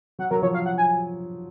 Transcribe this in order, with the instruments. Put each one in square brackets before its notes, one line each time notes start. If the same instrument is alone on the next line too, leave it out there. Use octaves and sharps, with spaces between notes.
[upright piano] F#3 [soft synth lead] F#5
[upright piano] F#3 [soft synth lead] A#4
[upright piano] F3 [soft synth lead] C#5
[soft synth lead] F5
F#5
G#5